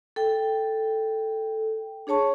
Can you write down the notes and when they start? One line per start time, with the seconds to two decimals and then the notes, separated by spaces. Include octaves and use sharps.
0.16 A4 G5
2.07 D4 G#4 C#5 A5 C#6